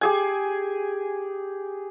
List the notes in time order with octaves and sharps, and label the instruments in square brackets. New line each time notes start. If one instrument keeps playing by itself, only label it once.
[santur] G4 G#4 G#5